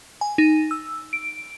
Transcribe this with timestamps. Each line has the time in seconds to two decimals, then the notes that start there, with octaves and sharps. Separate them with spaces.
0.21 G#5
0.38 D#4
0.71 E6
1.13 D7